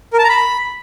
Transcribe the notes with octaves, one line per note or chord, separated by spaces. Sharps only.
A#4
A5
A#5
B5